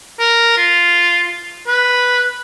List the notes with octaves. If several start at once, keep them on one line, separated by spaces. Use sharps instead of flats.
A#4
F4
B4